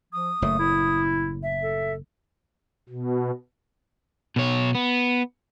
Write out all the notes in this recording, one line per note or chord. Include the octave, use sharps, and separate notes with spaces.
F3 D#6
F#1 A2 A3
E4
E5
A4
B2
B2 C#5
B3